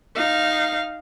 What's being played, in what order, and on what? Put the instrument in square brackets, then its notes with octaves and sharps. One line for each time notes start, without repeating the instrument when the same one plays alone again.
[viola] D#4 F5